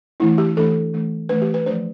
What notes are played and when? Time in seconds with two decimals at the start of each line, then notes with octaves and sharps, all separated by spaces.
0.20 E3 A3 D4 E4
0.38 G4
0.57 E3 A3 D4 A4
0.93 E3 A3 D4
1.29 E3 A3 D4 B4
1.42 G4
1.54 B4
1.66 F3 A3 D4 C5